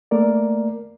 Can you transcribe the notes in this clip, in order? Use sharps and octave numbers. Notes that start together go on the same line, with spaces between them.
A3 A#3 A#4 D5